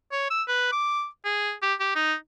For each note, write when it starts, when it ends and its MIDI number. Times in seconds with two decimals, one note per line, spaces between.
0.12 0.27 73
0.30 0.43 88
0.48 0.72 71
0.72 1.06 86
1.25 1.53 68
1.62 1.74 67
1.80 1.92 67
1.95 2.15 63